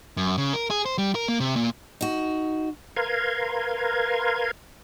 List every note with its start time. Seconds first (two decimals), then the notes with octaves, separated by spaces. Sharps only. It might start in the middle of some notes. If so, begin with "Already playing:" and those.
0.17 F#2
0.38 C#3
0.53 A#4
0.70 G#4
0.86 C5
0.98 G3
1.15 A#4
1.28 A#3
1.40 C3
1.56 A#2
2.01 D#4 F#4
2.96 A#4 B4 F5 A#5 C6 G#6